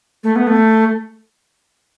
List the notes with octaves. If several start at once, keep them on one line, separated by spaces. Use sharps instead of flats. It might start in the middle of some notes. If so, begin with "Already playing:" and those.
A3
B3
A3